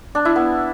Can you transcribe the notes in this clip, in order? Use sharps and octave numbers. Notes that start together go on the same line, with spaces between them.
D4
E4
B3